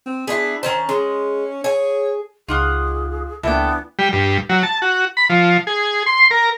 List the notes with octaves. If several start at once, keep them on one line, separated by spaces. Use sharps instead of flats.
C4
B3 D4 E4 G#4
D#3 C#4 C5 A5
G#3 C#4
G#4 C#5
C#2 D#4 F4 G#4 F#5 D6 D#6
C#2 E3 A#3 B3 D4 A4 G5
G3
G2
F#3
A5
F#4
B5
F3
G#4
C6
A#4